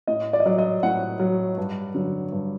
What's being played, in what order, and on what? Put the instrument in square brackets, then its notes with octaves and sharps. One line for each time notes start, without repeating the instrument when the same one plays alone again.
[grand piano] A2 D#5
D5
D#5
F#3 D5
D#5
A2 F#5
F#3
G2
D3 F#3
G2